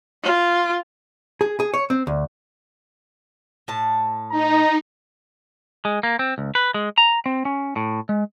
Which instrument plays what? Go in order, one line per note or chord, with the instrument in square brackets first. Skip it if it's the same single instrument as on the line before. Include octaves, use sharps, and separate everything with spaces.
[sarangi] F4
[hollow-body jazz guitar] G#4
G#4
C#5
C4
D2
[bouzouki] A2 A5
[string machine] D#4 [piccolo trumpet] A#5
[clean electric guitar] G#3
A#3
C4
C#2
B4
G#3
A#5
C4
C#4
A2
G#3